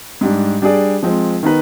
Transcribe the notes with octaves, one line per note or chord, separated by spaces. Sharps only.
G#2 G3 D4
G3 D4 G#4 D5
F3 G#3 C4
D#3 B3 D#4 B4